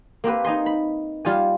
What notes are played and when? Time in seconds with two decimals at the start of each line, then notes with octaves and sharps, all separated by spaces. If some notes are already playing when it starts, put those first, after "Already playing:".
0.24 A#3 C4 G4 B4
0.44 D#4 D#5 G#5 C6
0.66 B5
1.25 G3 F4 G4 G#5